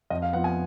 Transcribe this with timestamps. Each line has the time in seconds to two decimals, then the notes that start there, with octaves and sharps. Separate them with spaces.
0.10 F2 D#5
0.22 F5
0.33 F3 B3 F#5
0.44 G#5